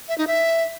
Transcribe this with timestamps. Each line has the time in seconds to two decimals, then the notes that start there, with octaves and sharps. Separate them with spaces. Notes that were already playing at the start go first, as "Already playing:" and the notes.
0.09 E5
0.18 D#4
0.27 E5